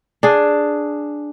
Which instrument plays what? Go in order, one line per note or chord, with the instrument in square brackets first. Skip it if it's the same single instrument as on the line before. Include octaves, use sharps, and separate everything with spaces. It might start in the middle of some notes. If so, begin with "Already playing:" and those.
[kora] D4 G#4